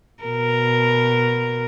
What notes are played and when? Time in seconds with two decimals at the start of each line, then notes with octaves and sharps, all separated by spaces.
0.24 B2 A#4